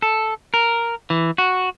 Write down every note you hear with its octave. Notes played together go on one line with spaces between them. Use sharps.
A4
A#4
E3
F#4